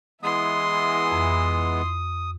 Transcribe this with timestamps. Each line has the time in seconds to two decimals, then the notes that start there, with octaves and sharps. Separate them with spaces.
0.23 E3 G#3 B3 E4 C6 D#6
1.11 F2